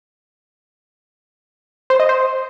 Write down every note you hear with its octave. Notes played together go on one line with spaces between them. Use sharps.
C5
D#5
C5